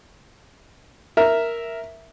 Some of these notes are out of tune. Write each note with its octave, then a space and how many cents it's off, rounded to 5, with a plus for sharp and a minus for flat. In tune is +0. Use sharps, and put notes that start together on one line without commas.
A#4 +0 E5 +0